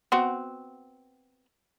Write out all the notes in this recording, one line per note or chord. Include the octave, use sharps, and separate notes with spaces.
B3 C4 F#4